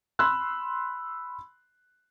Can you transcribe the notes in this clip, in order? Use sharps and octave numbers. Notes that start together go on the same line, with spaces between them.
B5 C6 E6 F#6